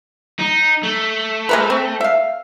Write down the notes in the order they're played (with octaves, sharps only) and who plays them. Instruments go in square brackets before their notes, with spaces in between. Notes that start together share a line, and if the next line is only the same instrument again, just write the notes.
[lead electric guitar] D#4
A3
[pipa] G#3 A#4 B4
C4
E5 F5